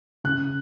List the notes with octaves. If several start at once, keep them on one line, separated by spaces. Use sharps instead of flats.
C#3 F#6